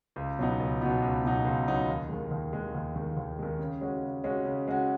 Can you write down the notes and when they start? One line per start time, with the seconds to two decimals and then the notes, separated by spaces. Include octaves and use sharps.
0.16 C#2
0.39 B2 F#3 B3 D#4
0.60 C#2
0.81 B2 F#3 B3 D#4
1.02 C#2
1.24 B2 F#3 B3 D#4
1.45 C#2
1.67 B2 F#3 B3 D#4
1.89 D#2
2.09 D#3 G#3
2.31 D#2
2.53 D#3 G#3
2.75 D#2
2.96 D#3 G#3
3.17 D#2
3.39 D#3 G#3
3.59 C#3
3.81 G#3 C#4 F#4
4.03 C#3
4.24 G#3 C#4 F#4
4.45 C#3
4.68 G#3 C#4 F#4